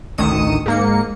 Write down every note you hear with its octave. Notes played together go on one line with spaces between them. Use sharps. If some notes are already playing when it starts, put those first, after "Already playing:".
A1 D2 D#3 D#6 C#7 E7
G#2 A#3 C#7